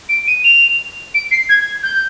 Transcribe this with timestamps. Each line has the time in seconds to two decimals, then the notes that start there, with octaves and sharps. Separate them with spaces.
0.09 D7
0.27 D#7
0.44 F7
1.14 D7
1.31 C7
1.49 G#6
1.83 G6